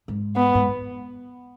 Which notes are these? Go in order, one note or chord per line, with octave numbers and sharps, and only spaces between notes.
G#2
B3
G#2